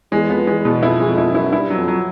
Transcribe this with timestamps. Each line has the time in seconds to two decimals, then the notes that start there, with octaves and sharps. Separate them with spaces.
0.12 E2 G#3
0.30 F2 B3
0.47 E2 G#3
0.65 E2 B2
0.83 F2 E4
1.00 G#3
1.06 F2
1.18 E4
1.30 F#2 E4
1.53 G2 E4
1.70 F#3
1.76 F2
1.88 F#3